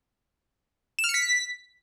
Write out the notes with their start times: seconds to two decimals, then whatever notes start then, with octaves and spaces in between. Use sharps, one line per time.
0.99 E7
1.04 F6
1.09 C#7
1.14 B6